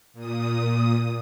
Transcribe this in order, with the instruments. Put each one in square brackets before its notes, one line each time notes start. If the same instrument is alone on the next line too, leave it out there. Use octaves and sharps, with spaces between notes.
[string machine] A#2 D#6